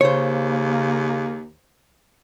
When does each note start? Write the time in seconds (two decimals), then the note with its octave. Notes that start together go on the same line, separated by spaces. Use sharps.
0.01 D#2 C#3 A#3 C5 C#5